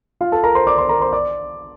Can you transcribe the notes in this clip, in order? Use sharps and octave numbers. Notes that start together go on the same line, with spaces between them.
F4 F5
A4 A5
A#4 A#5
C5 C6
D5 D6
C5 C6
A#4 A#5
C5 C6
D5 D6